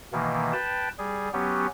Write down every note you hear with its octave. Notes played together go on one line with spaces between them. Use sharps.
B2 D#3 E3 A#3
B4 G5 A5
G3 G#4
F#3 B3 C#4 G4